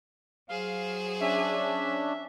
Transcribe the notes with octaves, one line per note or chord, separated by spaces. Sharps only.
F#3 G#4 C5 F5
C#4 D4 E5